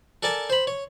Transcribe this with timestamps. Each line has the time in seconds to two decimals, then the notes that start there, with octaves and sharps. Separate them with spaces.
0.23 A4 A#4 D5 G#5 A5
0.50 C5 B5
0.67 C#5